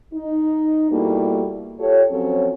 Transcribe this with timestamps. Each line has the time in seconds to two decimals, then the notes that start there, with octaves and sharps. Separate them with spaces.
0.12 D#4
0.90 B2 G3 A#3 E4 A4
1.79 F4 G4 A4 C#5
2.10 F3 F#3 C4 C#4 A4